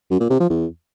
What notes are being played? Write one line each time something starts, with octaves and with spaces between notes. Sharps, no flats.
F#2
A#2
C3
F3
E2